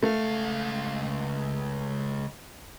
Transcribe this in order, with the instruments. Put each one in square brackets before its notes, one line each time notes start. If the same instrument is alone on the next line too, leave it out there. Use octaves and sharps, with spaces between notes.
[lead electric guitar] C#2 F5 [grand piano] A3